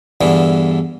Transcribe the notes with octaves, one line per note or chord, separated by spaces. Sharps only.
E2 G2 D3 E3